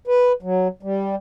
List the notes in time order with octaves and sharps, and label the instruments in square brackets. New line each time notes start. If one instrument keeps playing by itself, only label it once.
[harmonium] B4
F#3
G3